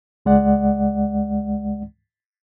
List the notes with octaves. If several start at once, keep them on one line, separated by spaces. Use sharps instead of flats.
C#2 G#3 D5 F#5